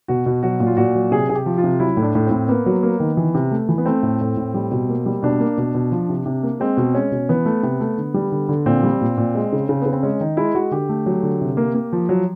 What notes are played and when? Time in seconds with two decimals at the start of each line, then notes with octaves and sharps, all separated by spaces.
0.08 B2 F#4
0.26 B2
0.43 F#3 F#4
0.60 A#2
0.67 F4
0.77 A#2 F#4
0.95 F#3
1.11 C3 G#4
1.29 C3 G#4
1.35 G4
1.46 F3
1.58 F4
1.64 C3
1.80 F#3 E4
1.97 A2
2.02 D4
2.15 A2
2.27 A2 C4
2.49 A#3 B3
2.66 F#3
2.83 A#3
3.00 D#3
3.17 E3
3.35 C3
3.51 A3
3.69 E3
3.78 B3
3.86 A3 C4
4.03 A2
4.21 A2
4.37 A2
4.54 G3
4.72 B2
4.89 A#3
5.06 G3
5.23 B2 D4
5.40 A#3
5.58 B2
5.75 B2
5.92 F3
6.09 C3
6.26 C3
6.43 A#3
6.60 G#3 C4
6.77 B2
6.94 G#3 C#4
7.11 B2
7.29 E3 B3
7.45 A3
7.63 C3
7.80 A3
7.98 D3
8.14 G3
8.32 D3
8.49 D3
8.66 A#2 C4
8.83 G3
9.01 A#2
9.17 A#2
9.35 G#3
9.52 C#3
9.69 C#3
9.82 C#3 B3
9.93 C4
10.03 G#3 C#4
10.20 D#3 D#4
10.37 G#3 E4
10.55 G#3 F#4
10.71 D3 G4
10.89 A3
11.06 F#3
11.23 D3
11.41 C3
11.57 A#3
11.75 A#3
11.93 F3
12.09 F#3